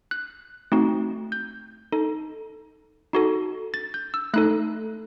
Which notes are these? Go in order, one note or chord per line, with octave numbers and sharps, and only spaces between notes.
F#6
A3 C4 D#4 F#4
G6
D#4 A4
D#4 F#4 A4
A6
G6
E6
A3 D#4 A4 F#6